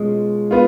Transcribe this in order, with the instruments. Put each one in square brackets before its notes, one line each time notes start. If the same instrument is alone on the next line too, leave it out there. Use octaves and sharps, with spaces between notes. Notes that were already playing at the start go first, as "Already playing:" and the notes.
Already playing: [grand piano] B2 C#4 F4 [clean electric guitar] G#3
[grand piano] B3 F4